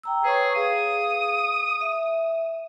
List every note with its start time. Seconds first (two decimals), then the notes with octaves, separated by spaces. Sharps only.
0.03 G5 A#5 E6
0.25 G#4 B4 C#5 C#6
0.55 G#4 F5 D#6
1.81 E5